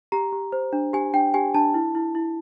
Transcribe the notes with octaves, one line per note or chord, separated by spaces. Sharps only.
G4 A#5
G4
C5
D4
G4 G#5
D4 G5
G4 G#5
D4 A5
E4
E4
E4